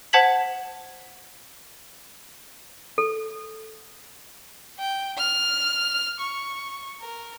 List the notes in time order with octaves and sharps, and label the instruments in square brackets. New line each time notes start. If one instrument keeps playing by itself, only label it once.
[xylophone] C5 F#5 A5 G#6 B6 F#7
[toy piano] A4
[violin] G5
F6
C#6
A#4